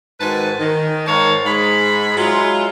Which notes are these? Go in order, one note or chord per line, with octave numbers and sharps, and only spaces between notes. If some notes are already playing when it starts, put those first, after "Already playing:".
G#2 D#3 F#4 B4 G#5 A5
D#3
G#2 D#3 A#4 C#5 F5 A5
G#2 G#4 B5
F#3 G#3 E4 F4